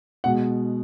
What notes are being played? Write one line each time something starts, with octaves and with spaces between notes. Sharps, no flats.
B2 G#3 F#5